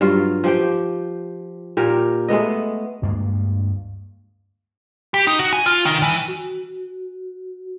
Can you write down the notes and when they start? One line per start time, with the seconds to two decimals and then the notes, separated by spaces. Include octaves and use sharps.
0.01 G2 F#3 F4
0.44 F3 G4 G5
1.77 A#2 G4 A#4
2.28 G#3 A3 B3 D#5
3.02 D2 G2 G#3 A#3
5.14 G4
5.27 D#4
5.39 F#4
5.53 G#5
5.66 F4
5.85 D#3
6.02 E3
6.28 F#4